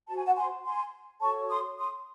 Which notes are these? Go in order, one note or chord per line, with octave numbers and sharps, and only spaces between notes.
F#4 C5 A5
G#5
F#5 A5
G#5 C6
G#5 C6
F#4 A4 C#5 A5 C#6
C6 D#6
C6 D#6